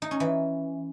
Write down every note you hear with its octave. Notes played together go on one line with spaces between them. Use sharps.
D#4
C#4
E3